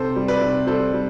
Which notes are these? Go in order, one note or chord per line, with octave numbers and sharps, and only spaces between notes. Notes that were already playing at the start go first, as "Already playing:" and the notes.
Already playing: C3 A4 C5
G3
B4 D5
C3
G3 A4 C5
G3